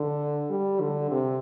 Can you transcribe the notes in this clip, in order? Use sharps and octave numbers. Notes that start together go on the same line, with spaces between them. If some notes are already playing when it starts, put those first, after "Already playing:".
Already playing: D3
G3
D3
C3